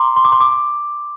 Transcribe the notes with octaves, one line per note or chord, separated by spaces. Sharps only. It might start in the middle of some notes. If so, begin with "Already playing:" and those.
Already playing: A#5 C6 D6
C6
D6
C6
D6